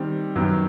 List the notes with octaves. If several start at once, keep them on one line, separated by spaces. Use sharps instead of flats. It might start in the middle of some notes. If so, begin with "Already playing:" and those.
Already playing: D#3 G3 C4
F#2 D#3 F#3 B3